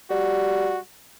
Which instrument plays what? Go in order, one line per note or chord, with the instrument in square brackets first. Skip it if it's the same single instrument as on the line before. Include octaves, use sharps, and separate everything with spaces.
[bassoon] G3 [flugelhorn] F#4